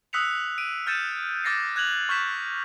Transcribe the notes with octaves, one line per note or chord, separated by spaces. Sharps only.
D#6 E6 F#6 B6 C#7 F7
D7 D#7
F6 G6 A6 C#7 D#7 E7
D6 F6 A6 A#6 C7 C#7
F#6 G#6 F7 F#7
C#6 F6 G6 B6 E7